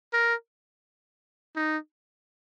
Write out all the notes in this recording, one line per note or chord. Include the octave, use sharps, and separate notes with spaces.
A#4
D#4